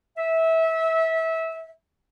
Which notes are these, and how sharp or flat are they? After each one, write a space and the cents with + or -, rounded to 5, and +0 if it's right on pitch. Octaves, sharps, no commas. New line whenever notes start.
E5 -20